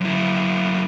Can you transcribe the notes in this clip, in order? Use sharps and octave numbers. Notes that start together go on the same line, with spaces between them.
F#2 E4